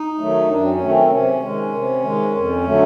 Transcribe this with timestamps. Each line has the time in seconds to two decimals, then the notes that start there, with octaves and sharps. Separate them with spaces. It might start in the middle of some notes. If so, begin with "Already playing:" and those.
Already playing: D#4
0.18 D#3 F#3 A3
0.48 F#2 D4
0.64 C4
0.69 C#4
0.80 D#3 F#3 A3
0.89 C4
1.10 C3 C#4
1.41 D#3 G#3
1.72 C3
2.03 D#3 G#3
2.34 F2
2.65 D3 F#3 A3